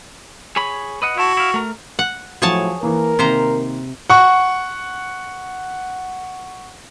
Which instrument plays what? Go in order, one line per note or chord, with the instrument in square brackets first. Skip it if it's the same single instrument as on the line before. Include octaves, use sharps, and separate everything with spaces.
[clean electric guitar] G#4 C#5 B5
B4 D#5 F#5
[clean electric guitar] E4 A5 [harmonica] F#4
[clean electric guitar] E4 F5
A3 A#4
[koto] F#5
[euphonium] A2 [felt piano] F3 F#3 [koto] G#4 C#5 A5
[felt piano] E3 A#3 [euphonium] A#4
[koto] C3 C5 A#5 [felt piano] D#3 A#3
[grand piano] F#5 C#6